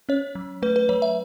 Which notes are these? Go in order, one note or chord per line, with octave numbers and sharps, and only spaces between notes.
C#4 C#5
F#3
A3 B4
B4
F#3 C#5
E5